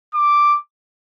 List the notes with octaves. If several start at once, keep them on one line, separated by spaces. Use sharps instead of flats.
D6